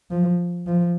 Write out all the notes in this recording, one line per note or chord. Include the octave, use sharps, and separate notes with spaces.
F3
F3